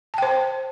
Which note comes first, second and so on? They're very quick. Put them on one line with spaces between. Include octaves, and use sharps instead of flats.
A5 G5 C5